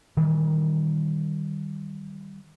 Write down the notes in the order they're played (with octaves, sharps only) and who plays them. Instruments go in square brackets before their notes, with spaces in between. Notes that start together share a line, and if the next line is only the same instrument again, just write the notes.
[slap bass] D#3 E3 G3